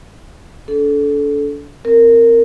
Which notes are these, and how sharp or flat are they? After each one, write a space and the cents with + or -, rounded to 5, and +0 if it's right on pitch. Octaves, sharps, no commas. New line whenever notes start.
D4 -35 A4 -20
C4 +0 A#4 -15